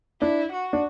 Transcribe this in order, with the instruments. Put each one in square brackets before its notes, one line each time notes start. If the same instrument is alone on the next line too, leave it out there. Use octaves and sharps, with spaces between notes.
[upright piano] D4 [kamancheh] E4
[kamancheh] F#4
[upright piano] D4